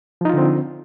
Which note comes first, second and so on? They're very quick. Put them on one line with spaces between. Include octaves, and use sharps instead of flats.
F3 D#4 F4 D3 C4